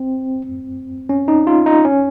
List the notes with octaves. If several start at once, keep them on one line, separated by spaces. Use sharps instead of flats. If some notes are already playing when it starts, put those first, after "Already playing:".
Already playing: C4
C#4
D#4
F4
D#4
C#4